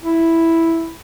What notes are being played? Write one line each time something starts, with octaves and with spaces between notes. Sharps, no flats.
E4